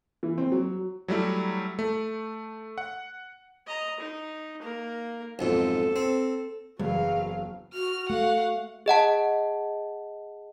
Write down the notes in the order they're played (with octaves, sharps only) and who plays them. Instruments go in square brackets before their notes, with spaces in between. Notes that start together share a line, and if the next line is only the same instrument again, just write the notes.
[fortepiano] E3
C4
F#3
[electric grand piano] F#3 G3 A3 E4
A3
F#5
[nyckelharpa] D#5 A#5
D#4
A#3 A#4
[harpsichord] B1 F2 G#2 [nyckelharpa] A4
[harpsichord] C4
[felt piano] F#1 [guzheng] E2 [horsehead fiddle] F#3 F5
[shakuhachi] F#4 [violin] F6
[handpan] A3 [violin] F5 F#5
[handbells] G#4 D#5 F#5 A5